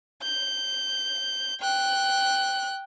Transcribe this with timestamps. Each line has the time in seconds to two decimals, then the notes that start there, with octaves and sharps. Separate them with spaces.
0.23 G6
1.60 G5 F#6